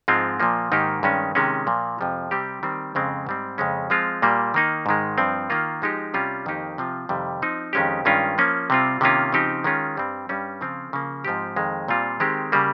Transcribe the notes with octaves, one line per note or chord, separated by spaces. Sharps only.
G#2 F3 G#3 C4 F4
A#2 F3 A#3
G#2 D#3 A#3 D#4 G4
G2 D#3 G#3 C#4
C3 D#3 G#3 C#4
A#2 F3 A#3
F2 C3 F3 G#3
C3 G3 C4 G4
D#3 G3 C4
F2 C#3 G#3 C4
G#2 G3 C4
F2 C#3 G#3 C#4
F3 G#3 C4 F4
A#2 G3 A#3
D#3 A#3 D#4
G#2 D#3 G#3
G2 F3 C4
D#3 A#3 F4
F3 G#3 D#4 G4
C3 G3 C#4 F4
F2 D#3 A#3 D#4 G4
C3 F3 C4 F4
F2 C3 D#3 G3
F3 C4 D#4
F2 D#3 G#3 C#4 G4
G2 D#3 G#3 C#4 F4
F3 A#3 C#4
C3 G3 C4 F4
C3 D#3 A#3 C#4 F4
C#3 F3 C4 D#4 G4
D#3 G#3 C#4 F4
G2 G3 C4
G2 G3 C#4
C#3 F3 C4 F4
C#3 F3 A#3
G#2 F3 C4 G4
F2 D#3 G#3
A#2 G3 C4 F4
D#3 G#3 C4 G4
C#3 G3 A#3